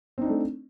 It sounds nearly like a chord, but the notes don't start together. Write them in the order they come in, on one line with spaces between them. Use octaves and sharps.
C4 D#4 D4 A3